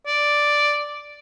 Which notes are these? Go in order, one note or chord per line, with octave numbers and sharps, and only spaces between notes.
D5